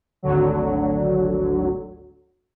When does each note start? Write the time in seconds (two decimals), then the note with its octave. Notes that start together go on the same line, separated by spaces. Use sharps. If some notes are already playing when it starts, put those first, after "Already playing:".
0.23 G#1 D2 D3 F#3